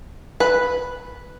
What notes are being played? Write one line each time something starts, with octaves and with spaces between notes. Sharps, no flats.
B4